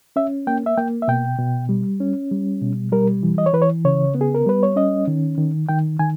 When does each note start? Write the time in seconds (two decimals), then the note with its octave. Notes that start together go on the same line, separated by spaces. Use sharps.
0.16 C#4 E5
0.47 A#3 G5
0.66 E5
0.77 A#3 G5
1.02 E5
1.08 B2 G5
1.39 B2
1.69 G3
2.00 C#4
2.31 G3
2.62 B2
2.92 G3 A#4
3.23 E3
3.38 D#5
3.46 C#5
3.53 E3 B4
3.62 C#5
3.85 C#3 C#5
4.15 B3
4.21 G#4
4.35 A#4
4.46 G3 B4
4.63 C#5
4.76 C#4 D#5
5.07 D#3
5.38 D#3
5.69 D#3 G5
5.99 D#3 G#5